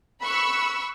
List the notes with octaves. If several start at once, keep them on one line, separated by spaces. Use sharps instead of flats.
B5 C#6 E6 F#6